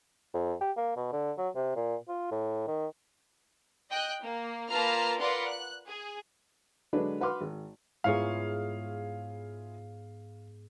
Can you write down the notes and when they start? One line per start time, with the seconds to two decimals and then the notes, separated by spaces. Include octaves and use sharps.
0.34 F2
0.61 G4
0.77 A#3
0.96 B2
1.12 D3
1.38 F#3
1.55 C3
1.75 A#2
2.08 F4
2.31 A2
2.67 D#3
3.89 D#5 G5 F#6
4.21 A#3
4.69 A#3 F4 B4 A5 A#5 F6
5.19 F4 A#4 B4 D5 F#5 C6
5.49 F#6
5.87 G#4
6.93 D3 F#3 G#3 D4 B4
7.21 F#4 B4 F#5 C6 D6 F6
7.41 G#1
8.04 G#2 B3 E4 F4 G#4 C#5 F5